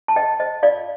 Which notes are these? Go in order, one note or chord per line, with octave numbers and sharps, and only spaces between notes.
A5
C5 D#5 G5
C5 D#5
F4 D5 F5